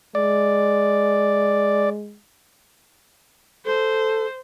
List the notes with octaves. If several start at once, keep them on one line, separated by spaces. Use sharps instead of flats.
G#3 D5
A4 C5